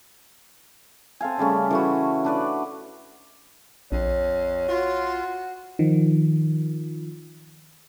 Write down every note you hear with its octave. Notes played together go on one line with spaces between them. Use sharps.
C4 A4 F5 G#5
C#3 G3 A3 C#4
E3 A3 F#4
D4 B4 D5
A#1 F2 C#5
F4 F#4
D#3 F3